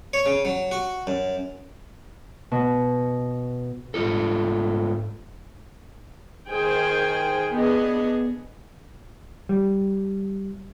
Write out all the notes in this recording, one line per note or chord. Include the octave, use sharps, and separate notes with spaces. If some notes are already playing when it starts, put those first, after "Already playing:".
C#5
C#3
F#3
F#4
F#2
B2
G#2 C#3 F4 A4
D#3 G#4 C5 G5 G#5
B3 D4 G#4 D#5
G3